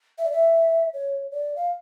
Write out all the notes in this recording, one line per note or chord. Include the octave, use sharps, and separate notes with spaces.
E5
D5
E5
C#5
D5
F5